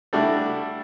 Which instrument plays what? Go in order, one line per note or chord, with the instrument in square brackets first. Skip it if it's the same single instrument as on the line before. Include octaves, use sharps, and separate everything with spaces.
[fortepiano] G3 A3 D4 E4 F#4